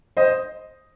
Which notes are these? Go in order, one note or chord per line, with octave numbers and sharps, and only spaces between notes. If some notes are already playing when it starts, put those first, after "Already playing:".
C5 D#5